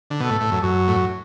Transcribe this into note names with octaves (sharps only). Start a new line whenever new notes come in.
D3
B2 A4
A2
A2
F#2
F#2 F#4
A2
F#2